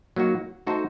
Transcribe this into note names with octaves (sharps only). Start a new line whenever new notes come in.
F#3 A#3 D#4 F#4
A3 D#4 F#4 A4 C5